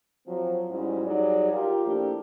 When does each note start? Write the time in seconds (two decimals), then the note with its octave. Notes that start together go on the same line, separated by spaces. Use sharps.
0.26 F3 F#3 C4
0.70 G#2 F#3 G3 C#4 E4
1.06 F#3 G3 D#4 G#4 D5
1.53 F4 G4 A#4
1.86 F3 A3 A#3 D4 E4 G4